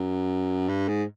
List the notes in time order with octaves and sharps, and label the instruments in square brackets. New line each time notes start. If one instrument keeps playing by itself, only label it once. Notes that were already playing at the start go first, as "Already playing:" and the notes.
Already playing: [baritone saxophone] F#2
G2
G#2